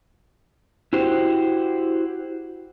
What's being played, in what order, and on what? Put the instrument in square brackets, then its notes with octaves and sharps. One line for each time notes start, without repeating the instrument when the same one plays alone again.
[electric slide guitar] E4 F#4 G4 C5